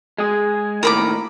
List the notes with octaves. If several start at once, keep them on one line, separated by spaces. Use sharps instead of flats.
G#3 G#4
D#2 A2 D#3 A#4 B5 D6